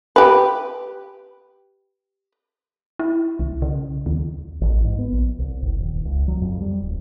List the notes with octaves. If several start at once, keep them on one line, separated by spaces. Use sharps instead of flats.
G4 B4
E4
C2
C#3
D#2
A1
G#2
B3
A#1
C2
F#1
D#1
C#2
F#3
F2
G3
D1